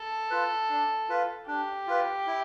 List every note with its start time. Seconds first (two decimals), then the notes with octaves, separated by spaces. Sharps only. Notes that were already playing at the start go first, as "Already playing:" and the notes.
Already playing: A4
0.30 F4 B4
0.70 D4
1.09 F4 B4
1.48 D4 G4
1.87 F4 B4
2.27 E4